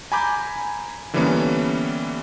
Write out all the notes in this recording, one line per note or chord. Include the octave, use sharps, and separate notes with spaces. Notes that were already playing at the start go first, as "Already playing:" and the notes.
G#5 A#5 B5 D6 G6
D3 E3 G3 A#3 B3 C#4